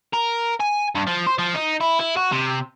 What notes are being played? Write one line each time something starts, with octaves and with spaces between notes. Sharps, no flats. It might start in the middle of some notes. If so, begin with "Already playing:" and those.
A#4
G#5
G2
F3
C5
F3
D#4
E4
E4
F#4
C3